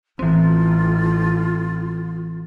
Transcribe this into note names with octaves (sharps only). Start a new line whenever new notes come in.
A1 E3 C4 F4